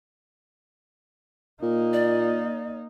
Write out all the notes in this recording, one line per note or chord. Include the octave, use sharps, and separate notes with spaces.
A#2 A#3 D#4
D5